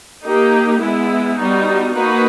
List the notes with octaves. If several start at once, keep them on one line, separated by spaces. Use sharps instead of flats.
A#3 D#4 G4
G#3 B3 E4
G3 B3 D#4 F#4
A#3 D#4 F#4 B4